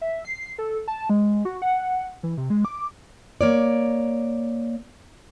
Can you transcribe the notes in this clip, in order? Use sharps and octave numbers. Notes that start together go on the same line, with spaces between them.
E5
C7
A4
A5
G#3
F#4
F#5
E3
C3
G#3
D6
A#3 C#5 D5